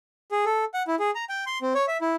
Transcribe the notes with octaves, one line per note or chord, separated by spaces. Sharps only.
G#4
A4
F#5
E4
G#4
A#5
G5
C6
C4
C#5
E5
E4